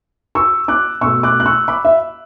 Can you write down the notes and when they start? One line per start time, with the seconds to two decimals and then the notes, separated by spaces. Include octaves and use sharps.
0.35 C#6 E6
0.68 D6 F#6
1.01 B2 A3 C#6 E6
1.23 D6 F#6
1.40 F#6
1.46 C#6 E6
1.68 B5 D6
1.85 E5